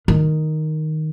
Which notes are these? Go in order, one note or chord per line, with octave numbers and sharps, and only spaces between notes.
D#3